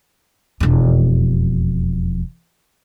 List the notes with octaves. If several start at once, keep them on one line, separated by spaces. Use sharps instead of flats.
E1 F2